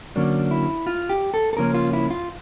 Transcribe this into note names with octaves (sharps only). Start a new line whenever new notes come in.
D3 F#3 A#3 C#4 D4
E4
F4
G4
A4
A4
C#3 F3 A#3 C#4 A#4
F4
E4
F4